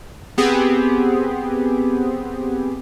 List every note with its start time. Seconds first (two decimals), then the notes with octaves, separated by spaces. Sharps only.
0.38 B3 C4 G4 G#4